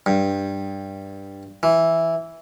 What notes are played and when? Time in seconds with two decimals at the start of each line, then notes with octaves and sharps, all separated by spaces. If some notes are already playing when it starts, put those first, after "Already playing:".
0.06 G2
1.63 E3